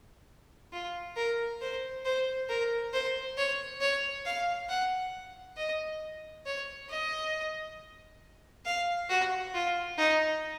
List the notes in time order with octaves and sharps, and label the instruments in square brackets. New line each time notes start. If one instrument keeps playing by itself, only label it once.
[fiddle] F4
A#4
C5
C5
A#4
C5
C#5
C#5
F5
F#5
D#5
C#5
D#5
F5
F#4
F4
D#4